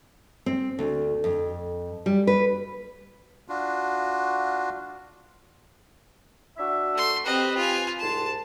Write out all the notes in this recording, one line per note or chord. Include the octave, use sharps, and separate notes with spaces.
C4
D2
F2
G3
B4
D4 F4 F#4
D4 F#4 E5
A3 C6
C4 G4 B4 D#5
F4 G#5
C2 G#2 A5 C6